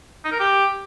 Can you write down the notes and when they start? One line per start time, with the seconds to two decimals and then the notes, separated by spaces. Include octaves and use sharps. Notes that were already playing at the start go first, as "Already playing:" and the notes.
0.25 D#4
0.32 A#4
0.40 G4